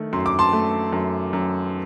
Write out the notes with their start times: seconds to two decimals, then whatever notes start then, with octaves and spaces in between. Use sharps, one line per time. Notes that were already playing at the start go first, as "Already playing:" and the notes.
Already playing: D#3 A3
0.13 F#2 C6
0.26 D6
0.39 A5 C6
0.53 A3
0.93 F#2
1.33 F#2